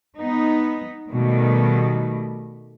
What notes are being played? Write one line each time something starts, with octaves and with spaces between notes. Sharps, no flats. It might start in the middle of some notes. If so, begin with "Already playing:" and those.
B3 D#4
B2 D#3 G3 A3